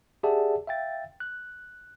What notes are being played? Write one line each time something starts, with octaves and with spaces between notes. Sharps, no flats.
G4 G#4 D5 E5 F#5 A5
E5 F5 G5 A6
F#6